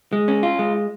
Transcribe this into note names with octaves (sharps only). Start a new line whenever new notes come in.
G#3
C#4
F4
G#3